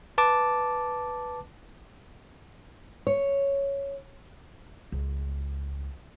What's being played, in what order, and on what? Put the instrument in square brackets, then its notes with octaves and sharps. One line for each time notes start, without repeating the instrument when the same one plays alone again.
[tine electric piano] B4 A5 D6
[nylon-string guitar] C#5
[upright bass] C#2